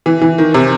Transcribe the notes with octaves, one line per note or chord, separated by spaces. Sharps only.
E3
E3
D#3
C3